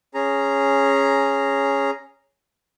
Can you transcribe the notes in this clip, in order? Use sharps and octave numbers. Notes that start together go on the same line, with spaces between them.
C#4 G#4 A#5